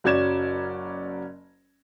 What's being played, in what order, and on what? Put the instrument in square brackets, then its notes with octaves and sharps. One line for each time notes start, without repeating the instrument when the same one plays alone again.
[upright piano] F#1 F#3 C#4 D5 G#6 E7